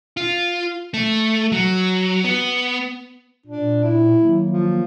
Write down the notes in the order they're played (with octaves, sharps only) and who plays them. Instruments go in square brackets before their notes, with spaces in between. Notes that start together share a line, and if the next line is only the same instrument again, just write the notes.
[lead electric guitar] F4
A3
F#3
B3
[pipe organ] A#2 [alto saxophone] D4
[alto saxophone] E4
[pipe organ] D#3 F#3 A#3
[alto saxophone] F3